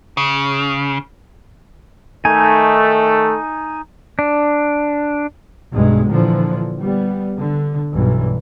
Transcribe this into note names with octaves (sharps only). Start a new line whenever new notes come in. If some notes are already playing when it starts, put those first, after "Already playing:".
C#3
D#3 A3 D#4 G#5
D4
B1 G2 G#3
A#2 D3 E3 F3
G3 B3
D3
B1 G2 E3